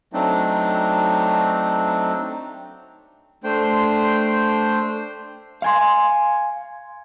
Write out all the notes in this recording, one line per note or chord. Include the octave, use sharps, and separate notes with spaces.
F#3 A3 C4 D4 D#4
A3 D4 C5 G5 C6
F5 G#5 C6